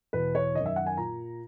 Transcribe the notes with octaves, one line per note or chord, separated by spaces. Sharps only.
E2 B2 B4
C#5
D#3 D#5
F#2
E5
F#5
G#5
A#2 A#5